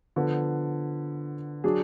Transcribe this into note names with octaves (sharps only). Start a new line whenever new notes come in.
D3 F3 B3
F#3 D4 G#4